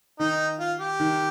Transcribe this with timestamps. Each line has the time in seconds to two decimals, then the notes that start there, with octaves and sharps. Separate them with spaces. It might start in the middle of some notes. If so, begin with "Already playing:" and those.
0.19 D#3 D#4
0.59 F4
0.80 G4
1.00 D#3